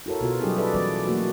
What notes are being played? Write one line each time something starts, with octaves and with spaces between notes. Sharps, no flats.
E4 F#4 A4 A#4 C#5
B2 B3 F4 F#4
F#3 G3 C#4 D#4 G4 G#4
G#4 A4 B4 D5 E5
E3 G3 B3 B4 D5
F#3 A3 A#3 F#4